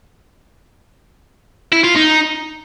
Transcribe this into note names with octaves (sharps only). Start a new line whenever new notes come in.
E4
F4
D#4